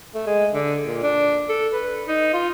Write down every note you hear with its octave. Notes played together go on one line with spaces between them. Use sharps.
A3
G#3
D3
A#2
D4
A4
B4
D#4
F4